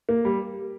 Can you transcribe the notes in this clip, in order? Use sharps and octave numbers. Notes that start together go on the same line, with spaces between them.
A#3
G3